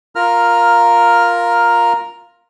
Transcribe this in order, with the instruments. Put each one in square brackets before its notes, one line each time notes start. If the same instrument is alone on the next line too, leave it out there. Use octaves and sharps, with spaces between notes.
[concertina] F4 A#4 A#5 F6